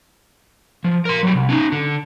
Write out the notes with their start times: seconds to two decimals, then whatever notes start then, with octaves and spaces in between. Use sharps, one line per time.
0.84 F3
1.05 A#4 C6
1.23 F#3 G3
1.35 C2
1.49 C#4 D#4
1.72 D3